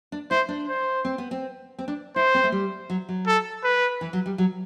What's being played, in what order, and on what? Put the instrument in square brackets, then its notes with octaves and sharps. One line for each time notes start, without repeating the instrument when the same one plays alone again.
[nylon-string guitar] D4
[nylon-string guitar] E4 [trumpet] C5
[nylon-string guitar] D4
[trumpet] C5
[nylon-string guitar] C4
B3
C4
C4
D4
[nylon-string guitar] E4 [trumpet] C5
[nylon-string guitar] C4
A3
G3
F#3
F#3
[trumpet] A4
B4
[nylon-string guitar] E3
F#3
G3
F#3